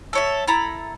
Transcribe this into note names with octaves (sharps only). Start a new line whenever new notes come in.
A4 C#5 E5
E4 A4 A#5 B5